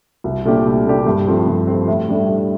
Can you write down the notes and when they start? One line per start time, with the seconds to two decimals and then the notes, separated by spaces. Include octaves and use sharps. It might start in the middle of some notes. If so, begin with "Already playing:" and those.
0.24 C2
0.45 A#2 A3 D4 G4
0.66 C2
0.86 A#2 A3 D4 G4
1.06 G2
1.27 F3 A3 C4
1.47 G2
1.67 F3 A3 C4
1.88 A2
2.09 G3 D4 A4
2.29 A2